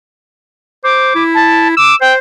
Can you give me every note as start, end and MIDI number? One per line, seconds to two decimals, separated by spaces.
0.84 1.10 72
0.84 1.23 86
1.15 1.72 64
1.34 1.68 81
1.77 1.96 86
1.77 1.94 88
2.01 2.19 72
2.01 2.13 79